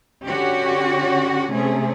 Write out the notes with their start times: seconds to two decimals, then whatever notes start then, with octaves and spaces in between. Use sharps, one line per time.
0.24 D3 C#4 F#4 G4 C#5
1.51 C3 A3 C#4 G#4